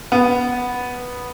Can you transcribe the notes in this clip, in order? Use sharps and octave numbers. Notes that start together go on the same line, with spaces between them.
B3